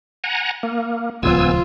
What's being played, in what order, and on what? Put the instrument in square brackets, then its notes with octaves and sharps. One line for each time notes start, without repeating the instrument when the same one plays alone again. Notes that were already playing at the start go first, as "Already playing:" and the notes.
[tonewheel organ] F#5 G#5 A#5
A#3
[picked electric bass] D#1 C#2 F3 [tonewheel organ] B3 G#5 E6 [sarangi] F4